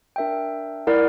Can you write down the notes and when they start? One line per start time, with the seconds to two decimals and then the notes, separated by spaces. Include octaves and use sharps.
0.16 D4 A#4 E5 G5
0.87 E4 A#4 D5 F#5